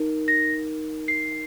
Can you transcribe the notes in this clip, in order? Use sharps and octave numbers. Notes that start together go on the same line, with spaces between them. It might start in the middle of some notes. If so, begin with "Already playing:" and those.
Already playing: D#4 A#4
A#6
C7